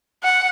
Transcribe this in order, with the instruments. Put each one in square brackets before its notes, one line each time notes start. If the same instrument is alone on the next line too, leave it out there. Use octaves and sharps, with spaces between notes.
[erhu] F#5